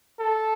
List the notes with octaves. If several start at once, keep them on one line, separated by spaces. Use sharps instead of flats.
A4